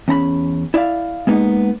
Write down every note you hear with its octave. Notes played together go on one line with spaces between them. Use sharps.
E2 C#4 A#5 B5
E4 D5 E5 F5
G#3 A#3 B3 D#4